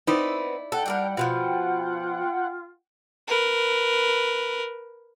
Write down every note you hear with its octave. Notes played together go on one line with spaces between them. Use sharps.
B3 C4 D#4 E4 D5
A4 F#5 G5
G3 D4 A4 A#4
B2 E3 F3 F4
A#4 B4